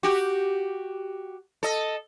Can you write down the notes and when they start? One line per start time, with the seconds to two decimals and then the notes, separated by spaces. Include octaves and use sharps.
0.03 F#4 G4
1.63 A4 D#5